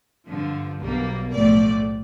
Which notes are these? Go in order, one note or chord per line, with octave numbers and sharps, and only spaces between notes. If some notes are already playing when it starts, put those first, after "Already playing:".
G2 D3 F3
B1 B2 G3 A#3
B1 A2 F3 A3 D5